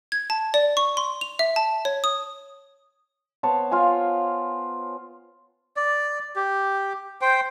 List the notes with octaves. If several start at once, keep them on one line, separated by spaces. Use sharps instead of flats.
G#6
A5
D5
C#6
C6
F7
E5
A5
C#5
D#6
B3 C5 C#5 A5
F4 F5 G#5
D5
G4
C5 G5